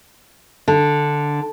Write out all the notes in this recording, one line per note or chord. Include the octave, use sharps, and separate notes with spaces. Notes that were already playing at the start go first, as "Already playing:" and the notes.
D3